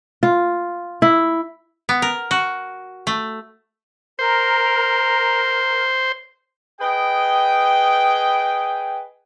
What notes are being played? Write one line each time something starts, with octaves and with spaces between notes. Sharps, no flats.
F4
E4
B3
A#4
F#4
A3
A#4 C5
G#4 B4 D#5 G5